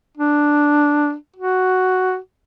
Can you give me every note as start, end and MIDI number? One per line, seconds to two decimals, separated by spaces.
0.17 1.14 62
1.36 2.18 66